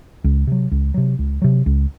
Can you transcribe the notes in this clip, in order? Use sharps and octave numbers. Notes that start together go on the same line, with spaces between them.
C#2
C3 F#3
C#2
C3 F#3
C#2
C3 F#3
C#2